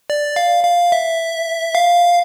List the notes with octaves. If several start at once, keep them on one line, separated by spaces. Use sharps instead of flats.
D5
F5
F5
E5
F5